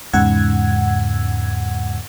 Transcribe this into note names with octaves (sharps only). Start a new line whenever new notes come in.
E2 G#2 C#3 F#5 E6 G#6